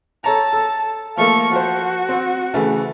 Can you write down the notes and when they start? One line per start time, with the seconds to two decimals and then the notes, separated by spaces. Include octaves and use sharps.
0.24 A4 C#5 A5 A#5
0.53 A4
1.17 F3 A3 A#3 F5 C#6
1.51 F3 F#4 C5
2.09 C4
2.54 C#3 E3 A3